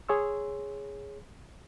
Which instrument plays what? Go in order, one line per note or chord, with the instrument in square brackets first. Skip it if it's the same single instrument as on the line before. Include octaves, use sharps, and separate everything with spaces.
[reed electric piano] G#4 C#5 C6 E6